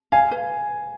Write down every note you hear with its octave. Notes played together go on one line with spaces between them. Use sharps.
F5 G#5
B4